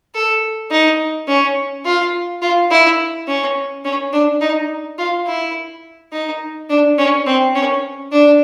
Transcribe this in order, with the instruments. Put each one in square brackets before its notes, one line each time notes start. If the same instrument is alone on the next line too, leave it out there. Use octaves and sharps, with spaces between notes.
[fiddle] A4
D#4
C#4
F4
F4
E4
C#4
C#4
D4
D#4
F4
E4
D#4
D4
C#4
C4
C#4
D4